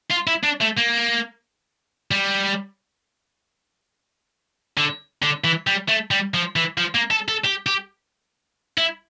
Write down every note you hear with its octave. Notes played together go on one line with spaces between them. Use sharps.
F4
E4
D4
A3
A#3
G3
D3
D3
E3
G3
A3
G3
F3
E3
F3
A#3
A4
A4
G4
G4
E4